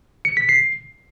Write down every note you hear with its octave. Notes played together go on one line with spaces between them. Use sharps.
C#7
B6
C7